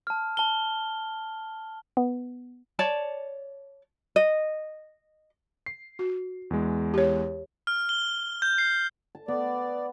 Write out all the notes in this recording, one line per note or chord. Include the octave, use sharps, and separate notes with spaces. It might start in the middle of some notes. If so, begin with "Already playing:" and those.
A5 F6
A5 G7
B3
C#5 D5 A5
D#5
C7
F#4
E2 G#3
G4 C#5
F6
G7
G6
C7
A5
B3 D5